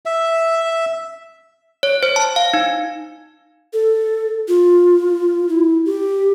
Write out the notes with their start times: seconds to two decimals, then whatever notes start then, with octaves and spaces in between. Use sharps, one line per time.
0.06 E5
1.83 C#5
2.03 C5
2.16 A5
2.36 F5
2.54 D#4
3.73 A4
4.48 F4
5.49 E4
5.86 G4